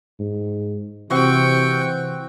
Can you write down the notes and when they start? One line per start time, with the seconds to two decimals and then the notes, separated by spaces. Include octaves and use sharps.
0.19 G#2
1.10 C3 E3 C4 F#4 G5 C#6